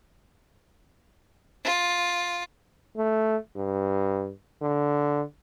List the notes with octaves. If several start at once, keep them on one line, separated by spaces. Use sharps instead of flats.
F4
A3
G2
D3